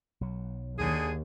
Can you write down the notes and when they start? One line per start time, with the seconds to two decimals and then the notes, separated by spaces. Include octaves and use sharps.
0.21 B1 F#3
0.78 D#2 D3 G#4